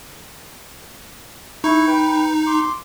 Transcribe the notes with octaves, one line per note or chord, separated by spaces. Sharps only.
D#4 E4 C#6
B4 G5
C6 D6